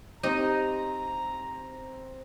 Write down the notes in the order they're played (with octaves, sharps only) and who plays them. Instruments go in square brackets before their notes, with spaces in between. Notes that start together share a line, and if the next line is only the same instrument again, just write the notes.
[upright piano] C4 [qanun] D#4 D#5 [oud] G4 [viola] A#5